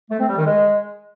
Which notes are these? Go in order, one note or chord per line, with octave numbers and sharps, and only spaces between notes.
A3
C4
G3
D#3
G#3